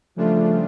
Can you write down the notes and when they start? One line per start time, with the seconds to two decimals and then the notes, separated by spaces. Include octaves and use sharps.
0.17 C#3 F3 G3 A3 D4 F4